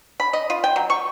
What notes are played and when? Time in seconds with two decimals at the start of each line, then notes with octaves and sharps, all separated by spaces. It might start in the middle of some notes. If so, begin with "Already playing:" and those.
0.20 B5
0.33 D#5
0.50 F4
0.64 G5
0.76 F#3
0.90 C#6